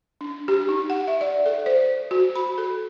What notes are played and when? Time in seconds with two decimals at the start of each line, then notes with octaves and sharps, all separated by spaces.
0.21 D4
0.48 G4
0.69 D#4
0.90 F#5
1.07 E5
1.21 D5
1.46 A4
1.66 C5
2.11 F#4
2.36 B5
2.58 A4